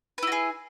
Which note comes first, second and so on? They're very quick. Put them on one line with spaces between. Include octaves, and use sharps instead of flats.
B4 E4 F#4 G#4